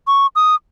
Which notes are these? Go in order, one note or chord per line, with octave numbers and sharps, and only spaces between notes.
C#6
D#6